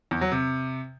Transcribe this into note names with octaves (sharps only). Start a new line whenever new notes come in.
E2
F#3
C3